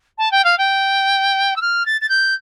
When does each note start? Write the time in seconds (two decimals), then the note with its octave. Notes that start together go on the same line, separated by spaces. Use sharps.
0.18 A5
0.31 G5
0.44 F5
0.58 G5
1.56 E6
1.61 F6
1.86 A6
2.01 A6
2.09 G6